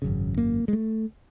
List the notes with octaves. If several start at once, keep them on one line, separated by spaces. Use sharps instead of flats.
G#1 F#2 C#3
A#3
G#3
A3